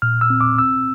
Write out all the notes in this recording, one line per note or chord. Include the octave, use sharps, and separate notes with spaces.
A#2 F6
E6
C4
D6
C4 E6